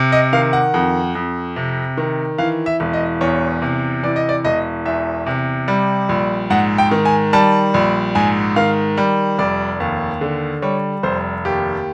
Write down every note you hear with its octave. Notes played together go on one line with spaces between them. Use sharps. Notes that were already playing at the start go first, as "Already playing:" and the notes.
Already playing: C3
D#5
D#3 F5
F#5
F2
F2
C3
D#3
E3 F5
E5
E1
D#5
E2 C#5
C3
E3 D5
D#5
D5
E1 D#5
E2 E5
C3
G3
A#1
G#2 F#5
G5
D#3
G#5
G3 A5
A#1
G#2 G#5
D#3 F5
G3
F1 D5
D#2
D3
G3 C#5
F1 C5
D#2 G4